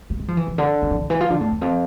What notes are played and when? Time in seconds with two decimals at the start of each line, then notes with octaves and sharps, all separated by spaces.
0.10 A3
0.20 G#3
0.28 F3
0.37 E3
0.47 C3
0.58 D3
0.82 F3
0.91 E3
0.99 D3
1.10 E3
1.20 F3
1.30 D3
1.41 A2
1.51 E2
1.61 F2